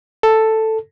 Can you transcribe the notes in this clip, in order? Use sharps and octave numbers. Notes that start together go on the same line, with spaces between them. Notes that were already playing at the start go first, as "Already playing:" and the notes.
A4